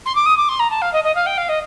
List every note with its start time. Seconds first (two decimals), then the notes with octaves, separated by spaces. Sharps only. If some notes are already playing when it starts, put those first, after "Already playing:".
0.06 C6
0.15 D6
0.26 D#6
0.37 D6
0.49 C6
0.59 A#5
0.70 A5
0.82 F5
0.93 D#5
1.04 D#5
1.15 F5
1.26 G5
1.37 F5
1.49 D#5